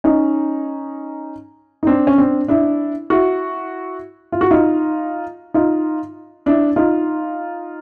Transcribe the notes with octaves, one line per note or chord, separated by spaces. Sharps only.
C#4 D#4
D#4
C4 D4
C#4
C4 D4
D4 E4
E4 F#4
F4
F#4
D#4 F4
D#4 F4
D4 E4
D#4 F4